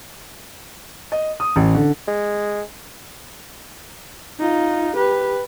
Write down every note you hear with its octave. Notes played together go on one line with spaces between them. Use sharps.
D#5
D#6
A1
D3
G#3
D#4 F4
G4 B4